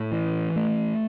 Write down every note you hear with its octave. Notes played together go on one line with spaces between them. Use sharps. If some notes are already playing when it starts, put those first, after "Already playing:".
Already playing: A2
E3
A3